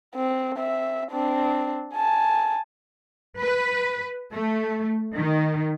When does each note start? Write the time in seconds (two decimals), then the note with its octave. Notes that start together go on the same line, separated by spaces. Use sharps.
0.15 C4
0.59 C4 E5
1.11 C4 D4
1.95 G#5 A5
3.38 B4
4.33 A3
5.15 D#3